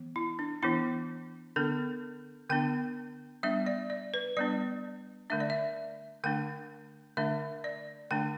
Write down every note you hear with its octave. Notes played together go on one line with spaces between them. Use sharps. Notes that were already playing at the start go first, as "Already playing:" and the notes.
Already playing: E3 B3
E4
D4
E3 B3 D4 E4
D3 B3 D4 A4
D3 B3 D4 G5
G3 B3 D4 E5
D5
D5
B4
G3 B3 D4 D5
D3 A3 D4 E5
D5
E5
D3 A3 D4 G5
D3 A3 D4 E5
D5
D3 A3 D4 G5